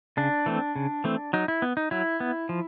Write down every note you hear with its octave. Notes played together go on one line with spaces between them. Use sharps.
C#3 D4
E3 A3 C4
C#3
E3 A3 C4
F#3 D#4
E4
B3
D#4
F#3 E4
B3
F3